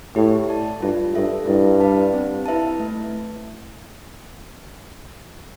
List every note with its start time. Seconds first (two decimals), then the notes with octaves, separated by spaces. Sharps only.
0.16 A2 G4
0.49 D5 A5
0.81 G2 F4
1.15 G2 A4 E5
1.47 G2 E4
1.80 B4 F5 A5
2.14 C4
2.46 E4 B4 E5 A5
2.80 A3